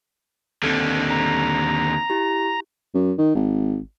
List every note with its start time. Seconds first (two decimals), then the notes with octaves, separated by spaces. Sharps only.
0.63 D#2 D3 C4 A4 F6
1.10 A#5
2.10 E4 G4
2.94 F#2
3.18 D#3
3.35 G#1